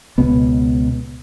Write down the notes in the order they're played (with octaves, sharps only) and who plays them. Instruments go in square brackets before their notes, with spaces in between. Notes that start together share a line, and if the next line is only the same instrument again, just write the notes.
[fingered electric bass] C#2 B2 B3